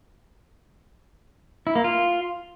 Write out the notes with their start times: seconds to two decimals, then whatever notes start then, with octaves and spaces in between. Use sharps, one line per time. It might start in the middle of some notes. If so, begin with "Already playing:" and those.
1.67 E4
1.75 A#3
1.84 F4